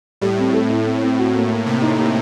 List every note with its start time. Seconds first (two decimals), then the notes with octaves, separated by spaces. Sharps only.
0.21 A2 G3
0.38 C4
0.53 A4
0.70 E4
0.85 C4
1.02 C4
1.18 F#4
1.34 A#3
1.50 A#3
1.66 C3 A#3
1.82 D#4
1.98 A#3